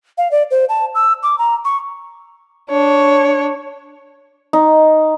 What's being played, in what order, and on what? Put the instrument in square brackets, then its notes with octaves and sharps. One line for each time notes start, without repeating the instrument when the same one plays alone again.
[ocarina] F5
D5
C5
A5
E6
D6
A#5
C#6
[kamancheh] D4 C#5
[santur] D#4